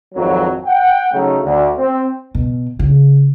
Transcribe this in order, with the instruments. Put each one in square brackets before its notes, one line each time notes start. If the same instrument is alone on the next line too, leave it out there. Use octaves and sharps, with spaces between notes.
[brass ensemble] G#1 F2 F#3
F#5 G5
C#3 F#3 A3 D#4
D2 D3
C4
[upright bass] B2
C#3